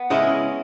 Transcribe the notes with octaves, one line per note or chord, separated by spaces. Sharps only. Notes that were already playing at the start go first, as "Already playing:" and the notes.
Already playing: B3
C#3 G#3 C#4 E4 D#5